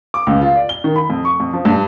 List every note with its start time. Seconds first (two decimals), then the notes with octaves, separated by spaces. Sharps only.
0.14 D6
0.27 C#2
0.41 F4
0.56 D5
0.69 G7
0.84 D#3
0.96 B5
1.10 F2
1.25 C#6
1.40 F2
1.53 F3
1.65 G2